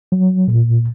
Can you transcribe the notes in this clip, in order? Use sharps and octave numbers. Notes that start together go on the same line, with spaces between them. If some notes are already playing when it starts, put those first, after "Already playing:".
F#3
A#2